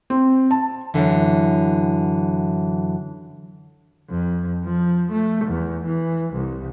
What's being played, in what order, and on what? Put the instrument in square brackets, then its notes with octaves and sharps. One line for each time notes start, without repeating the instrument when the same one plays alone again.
[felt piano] C4
A5
[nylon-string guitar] F#2 A#2 D3 E3
[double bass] F2
F3
A3
E2
E3
C2